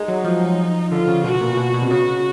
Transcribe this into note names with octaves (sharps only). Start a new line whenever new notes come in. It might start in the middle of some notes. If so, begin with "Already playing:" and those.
Already playing: G#3 D#4
F#3
F3
D3 F4
C#3
B2 F#4
A#2
B2
B2
C3
C#3 F#4